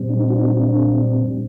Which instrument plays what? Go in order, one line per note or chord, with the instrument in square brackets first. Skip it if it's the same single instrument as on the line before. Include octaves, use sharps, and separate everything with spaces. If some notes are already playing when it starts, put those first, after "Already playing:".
Already playing: [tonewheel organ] A#2 G3 C4
D4
D#4
F#4
D4
D#4
D4